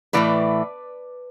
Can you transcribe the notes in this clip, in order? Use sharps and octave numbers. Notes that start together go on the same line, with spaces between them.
A2 E3 A3 B4 D5